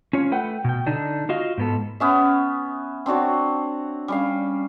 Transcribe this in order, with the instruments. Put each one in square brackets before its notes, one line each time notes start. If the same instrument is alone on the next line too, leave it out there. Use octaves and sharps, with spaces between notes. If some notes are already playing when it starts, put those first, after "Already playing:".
[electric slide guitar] C#4 F4 C#5
A3 B4 F#5 G5
B2 G5
D3 D4 D#4
F4 F#4 D#5 F5
G#2 B3 A4
[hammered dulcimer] B3 C#4 E5
C4 D4 F#4 C#5
G3 C#4 F5